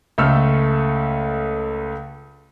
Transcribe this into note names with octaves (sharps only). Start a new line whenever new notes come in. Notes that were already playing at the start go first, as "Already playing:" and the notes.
C#2 A3 A4 E6 F6